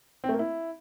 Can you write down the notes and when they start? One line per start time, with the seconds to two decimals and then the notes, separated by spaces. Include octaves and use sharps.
0.24 C4
0.29 A3
0.34 A#3
0.39 E4